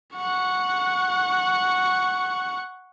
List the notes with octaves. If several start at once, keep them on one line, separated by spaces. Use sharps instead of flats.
F#5 C#6